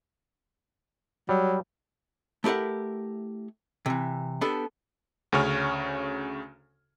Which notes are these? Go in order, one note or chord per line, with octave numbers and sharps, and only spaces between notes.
F#3 G3
A3 E4 G4 A#4 F#5
C3 E3
B3 D4 G4 A4
D2 C#3 C#4 C#5 F6